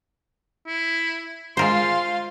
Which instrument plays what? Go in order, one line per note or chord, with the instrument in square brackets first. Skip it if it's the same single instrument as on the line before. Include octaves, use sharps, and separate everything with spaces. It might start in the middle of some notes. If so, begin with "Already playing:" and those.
[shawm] E4
[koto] G#3 A#4 C5 [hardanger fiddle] F4 F5 [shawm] C6